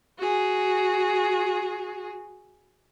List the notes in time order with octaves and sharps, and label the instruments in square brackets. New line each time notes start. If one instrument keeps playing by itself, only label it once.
[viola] F#4 G#4